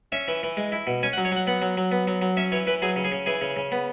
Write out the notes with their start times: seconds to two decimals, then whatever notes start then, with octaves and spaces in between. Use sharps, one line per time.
0.12 C#4 E5
0.28 E3
0.43 E3
0.57 G#3
0.72 E4
0.87 B2
1.03 C#4 G#5
1.13 F#5
1.17 F#3
1.25 C#5
1.32 F#3 F#5
1.47 B3 F#5
1.62 F#3
1.77 F#3
1.92 B3
2.07 F#3
2.22 F#3
2.37 C#4 E5
2.52 E3 C#5
2.67 E3 B4
2.82 F#3 G#4
2.96 C#3
3.04 G#4
3.12 C#3
3.26 E3 G#4
3.41 C#3
3.56 C#3
3.72 B3